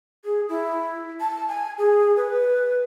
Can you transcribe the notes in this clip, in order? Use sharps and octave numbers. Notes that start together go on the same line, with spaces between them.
G#4
E4
A5
G#5
G#4
B4